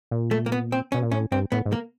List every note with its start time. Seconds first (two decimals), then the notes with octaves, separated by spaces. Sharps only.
0.11 A#2
0.31 A3
0.46 A#3
0.52 B3
0.72 C4
0.92 B2 C#4
1.03 A#2
1.12 A2 C#4
1.31 G2 C4
1.52 A2 B3
1.66 G#2
1.73 A#3